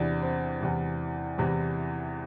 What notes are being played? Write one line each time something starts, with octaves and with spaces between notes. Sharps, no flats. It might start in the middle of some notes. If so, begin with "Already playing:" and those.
Already playing: E2 C3 E3 D4
C4
E2 C3 E3
E2 C3 E3